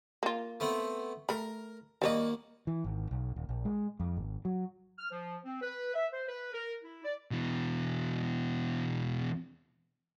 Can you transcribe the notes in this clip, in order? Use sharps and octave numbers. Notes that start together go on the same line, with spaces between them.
A#3 F4
A3 B3 C4
A3 A#4 B5
D#2 G3 A#3 F#4 C#5 D#5
E3
G#1
B1
D#1
A#1
G#3
F2
G#1
F#3
F6
F3
C4
B4
E5
C5
B4
A#4
E4
D5
B2 E3